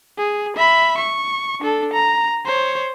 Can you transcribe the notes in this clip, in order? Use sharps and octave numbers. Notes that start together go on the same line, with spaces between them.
G#4
E5 B5
C#6
D4 A4
A#5
C5 C#5